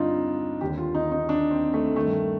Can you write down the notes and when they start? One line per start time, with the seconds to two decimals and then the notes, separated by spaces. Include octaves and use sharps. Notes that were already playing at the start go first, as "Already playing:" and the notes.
Already playing: G2 D3 C4 D4 D#4 F4
0.61 D#2 D3 G4
0.78 F4
0.95 D#4
1.12 D#4
1.29 D4
1.51 C4
1.74 A3
1.96 G2 D#3 A3